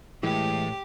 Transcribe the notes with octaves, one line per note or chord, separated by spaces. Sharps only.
A2 E3 G#3 G4